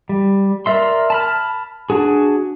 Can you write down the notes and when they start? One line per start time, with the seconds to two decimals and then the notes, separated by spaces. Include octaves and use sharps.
0.09 G3
0.66 A#4 D5 E5 C6
1.10 A5 B5 F6
1.90 D4 F#4 G#4